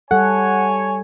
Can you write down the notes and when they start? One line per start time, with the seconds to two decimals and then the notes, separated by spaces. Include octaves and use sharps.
0.11 G3 A4 C#5 F#5 G#5